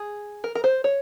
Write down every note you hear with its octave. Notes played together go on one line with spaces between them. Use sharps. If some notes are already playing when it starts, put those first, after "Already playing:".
Already playing: G#4
A#4
A#4
C5
C#5